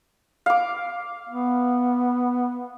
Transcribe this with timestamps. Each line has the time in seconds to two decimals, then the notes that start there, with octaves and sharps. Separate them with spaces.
0.46 F5 D6
1.29 B3